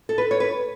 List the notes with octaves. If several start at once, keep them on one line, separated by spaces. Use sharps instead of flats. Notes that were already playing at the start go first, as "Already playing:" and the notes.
A4
B4
C#5
B4